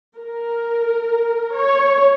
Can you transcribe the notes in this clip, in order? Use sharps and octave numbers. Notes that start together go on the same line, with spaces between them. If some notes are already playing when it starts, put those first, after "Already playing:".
A#4
C#5